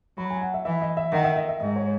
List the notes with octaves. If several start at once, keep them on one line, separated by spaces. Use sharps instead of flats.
F#3 B5
G#5
F#5
E5
E3 E5
D#5
E5
D#3 F#5
E5
D#5
E5
G#2 D#5
C#5